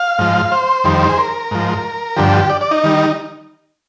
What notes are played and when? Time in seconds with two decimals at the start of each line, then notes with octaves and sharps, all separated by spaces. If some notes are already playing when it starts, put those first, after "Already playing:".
Already playing: F5
0.19 G#2 F3
0.52 C5
0.84 F2 D#3 G3
1.09 G#4
1.18 A#4
1.51 G#2 F3
2.17 G2 D3 F3 G4
2.50 D5
2.61 D5
2.71 D#4
2.84 D#3 G3